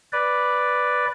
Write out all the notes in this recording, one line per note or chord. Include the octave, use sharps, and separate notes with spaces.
B4 D5